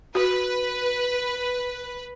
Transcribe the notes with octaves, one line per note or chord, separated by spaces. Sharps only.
F#4 B4